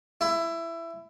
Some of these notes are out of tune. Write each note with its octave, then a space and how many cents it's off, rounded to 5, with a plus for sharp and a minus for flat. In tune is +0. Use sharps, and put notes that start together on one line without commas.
E4 +15